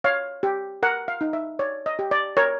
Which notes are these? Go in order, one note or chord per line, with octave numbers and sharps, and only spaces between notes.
C#5 F5
G4
A#4 F#5
F5
D#4
E5
C#5 D5
D#5
G4
D5
A#4 C#5